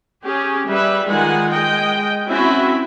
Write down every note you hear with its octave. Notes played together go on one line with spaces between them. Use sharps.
C#4 G4 G#4
G3 B4 E5
D#3 G#3 F4 F#5 G#5
G#3 D#5 G5
C4 C#4 E4 F#4 E5